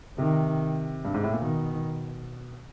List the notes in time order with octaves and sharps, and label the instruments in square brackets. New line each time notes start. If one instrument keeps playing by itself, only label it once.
[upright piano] C3 [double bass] D#3
[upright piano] G2
G#2
A2
A#2
[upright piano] B2 [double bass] D#3